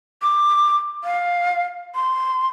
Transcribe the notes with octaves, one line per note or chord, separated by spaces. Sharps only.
D6
F5
C6